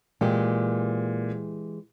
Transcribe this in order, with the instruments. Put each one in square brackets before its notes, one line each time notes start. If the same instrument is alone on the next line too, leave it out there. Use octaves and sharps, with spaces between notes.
[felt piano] A#2 [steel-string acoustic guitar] E3 G#3 G4